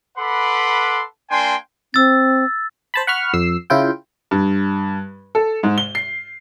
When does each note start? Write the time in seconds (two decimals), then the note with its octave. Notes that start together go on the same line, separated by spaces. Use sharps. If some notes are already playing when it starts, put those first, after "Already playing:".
0.17 A4 B4 F#5 B5 C6 D6
1.31 A#3 D4 G5 G#5 C6
1.94 C4 E6 A6
2.94 C5 A5 B5
3.07 F#5 B5 C#6 F6
3.33 F2 E6 C7
3.70 C#3 E4 F4 G5
4.31 G2
5.35 A4
5.63 G#2
5.78 G7
5.95 C7